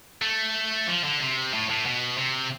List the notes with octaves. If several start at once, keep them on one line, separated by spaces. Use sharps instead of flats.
A3
F3
D3
C3
A2
A2
B2
C3